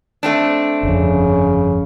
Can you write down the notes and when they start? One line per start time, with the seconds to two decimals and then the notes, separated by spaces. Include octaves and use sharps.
0.23 A3 C4 D4
0.83 G1 F2 C#3